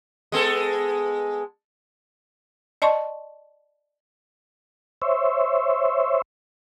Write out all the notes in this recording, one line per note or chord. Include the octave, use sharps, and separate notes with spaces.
G#3 B3 A4
D5 D#5 A5 C6 C#6
C5 C#5 E5